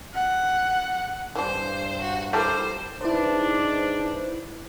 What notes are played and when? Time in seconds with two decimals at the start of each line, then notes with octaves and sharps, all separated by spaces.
0.15 F#5
1.35 G2 E3 D4 C5
2.02 F#4
2.33 G3 E4 A4 A#4 C5
3.01 G#2 D4 E4 B4 C5